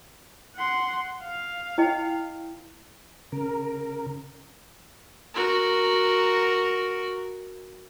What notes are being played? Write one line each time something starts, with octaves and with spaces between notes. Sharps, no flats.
F#5 C6
F5
E4 D#5 G5
C#3 A#4
F#4 A#4